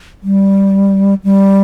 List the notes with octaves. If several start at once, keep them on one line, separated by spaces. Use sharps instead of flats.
G3
G3